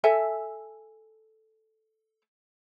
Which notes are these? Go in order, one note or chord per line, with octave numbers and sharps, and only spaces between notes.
A4 E5 G#5